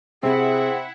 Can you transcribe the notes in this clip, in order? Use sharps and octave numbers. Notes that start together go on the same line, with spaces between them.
C3 C4 E4 G#4 F#5